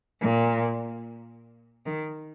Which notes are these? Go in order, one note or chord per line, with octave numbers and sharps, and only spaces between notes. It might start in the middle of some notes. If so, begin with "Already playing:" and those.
A#2
D#3